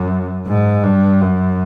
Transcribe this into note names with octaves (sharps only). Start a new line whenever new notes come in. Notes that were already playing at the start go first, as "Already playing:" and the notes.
Already playing: F#2
G#2
G2
F#2